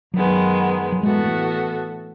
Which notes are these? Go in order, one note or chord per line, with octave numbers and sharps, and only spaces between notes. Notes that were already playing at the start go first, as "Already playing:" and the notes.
F#2 D#3 F#3 G#3 B3
F#3
A2 E3 G#3 B3 F#4 A4
A3